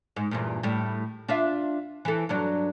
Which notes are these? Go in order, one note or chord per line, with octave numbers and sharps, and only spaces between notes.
G#2
E2 G2 A#2
A2 G3
D4 F4 E5
E3 A4
G2 F#3 D4